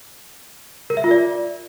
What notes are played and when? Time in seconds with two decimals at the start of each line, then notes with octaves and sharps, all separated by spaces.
0.90 A#4
0.97 E5
1.04 F4
1.11 D5